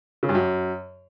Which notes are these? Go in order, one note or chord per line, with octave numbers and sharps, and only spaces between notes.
C#3
G2
F#2